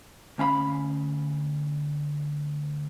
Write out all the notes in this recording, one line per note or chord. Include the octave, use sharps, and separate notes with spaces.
D2 C#4 F5 B5